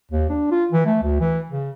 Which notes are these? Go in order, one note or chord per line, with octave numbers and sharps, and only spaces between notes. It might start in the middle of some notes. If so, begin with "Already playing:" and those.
D#2
D4
F4
E3
A3
D2
E3
C#3